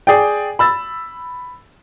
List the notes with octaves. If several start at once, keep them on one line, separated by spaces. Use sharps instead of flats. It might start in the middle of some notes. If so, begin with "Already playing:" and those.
G#4 D5 G5
B5 E6 A6